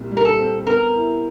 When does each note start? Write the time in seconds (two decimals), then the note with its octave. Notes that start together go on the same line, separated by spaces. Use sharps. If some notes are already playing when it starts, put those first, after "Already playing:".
Already playing: C2 A#2 G3
0.11 G3
0.17 A#4
0.25 A4
0.39 C4
0.67 B3 A#4
0.95 E4